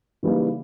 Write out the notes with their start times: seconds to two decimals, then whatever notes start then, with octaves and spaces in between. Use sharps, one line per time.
0.23 C#3 E3 G3 A#3 D#4